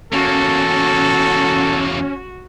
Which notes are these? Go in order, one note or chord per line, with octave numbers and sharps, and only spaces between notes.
E2 A#3 C#4 F#4 A4